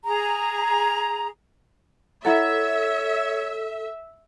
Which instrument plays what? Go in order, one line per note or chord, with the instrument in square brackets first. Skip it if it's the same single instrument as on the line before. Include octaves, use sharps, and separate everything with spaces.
[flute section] G#4 A#5
[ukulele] E4 F#5 A#5 [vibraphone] A4 [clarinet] C#5 [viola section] E5